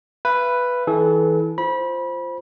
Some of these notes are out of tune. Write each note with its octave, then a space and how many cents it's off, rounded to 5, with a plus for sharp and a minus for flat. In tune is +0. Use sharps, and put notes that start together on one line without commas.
B4 +0 E5 +45
E3 -25 A4 -40
F4 +0 C5 +0 B5 -25